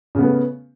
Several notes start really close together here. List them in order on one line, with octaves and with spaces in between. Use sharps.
C#3 B3 A3